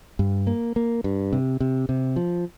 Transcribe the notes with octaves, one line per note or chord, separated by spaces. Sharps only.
G2
A#3
A#3
G2
C3
C3
C3
F3